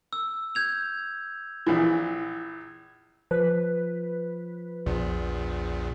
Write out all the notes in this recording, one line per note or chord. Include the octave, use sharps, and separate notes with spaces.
E6
G6 G#6 F7
A#1 E3
F3 B4
A#1 E2 A#2